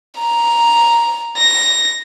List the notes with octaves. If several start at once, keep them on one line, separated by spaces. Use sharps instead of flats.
A#5
A#6